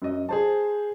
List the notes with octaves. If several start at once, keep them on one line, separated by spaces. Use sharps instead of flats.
F#2 D#5
G#4 C5 A5